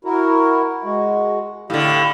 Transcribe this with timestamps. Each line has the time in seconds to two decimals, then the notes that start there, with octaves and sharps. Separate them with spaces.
0.05 E4 F#4 A#4
0.84 G#3 F#4
1.70 A2 D3 G4 F5